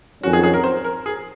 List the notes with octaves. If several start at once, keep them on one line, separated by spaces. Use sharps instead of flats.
F2 D#3 F#3 C#4 F#4
G#4
G#4
A#4
C5
A#4
G#4